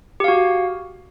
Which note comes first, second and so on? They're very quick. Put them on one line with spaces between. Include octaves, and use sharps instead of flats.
G4 F5 F#4